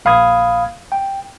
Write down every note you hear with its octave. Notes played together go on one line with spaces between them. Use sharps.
A#1 F5 B5 D#6 G#6
G5